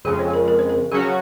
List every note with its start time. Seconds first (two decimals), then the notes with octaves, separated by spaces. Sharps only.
0.05 F2 C#3 G#3 G#4
0.19 C5
0.28 G#4
0.34 A#4
0.48 A#4
0.59 C5
0.69 A#4
0.92 C#3 F#3 C#4 F#4 G#4